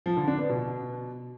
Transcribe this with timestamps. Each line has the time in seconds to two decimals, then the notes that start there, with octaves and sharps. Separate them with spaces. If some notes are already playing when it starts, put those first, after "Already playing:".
0.06 F3
0.17 D3
0.28 D4
0.38 B3
0.49 B2